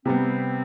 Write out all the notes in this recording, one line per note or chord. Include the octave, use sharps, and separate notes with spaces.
C3 G3 B3 C4